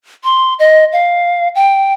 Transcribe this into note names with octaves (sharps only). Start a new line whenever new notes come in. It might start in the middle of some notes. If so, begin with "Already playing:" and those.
C6
D#5
F5
G5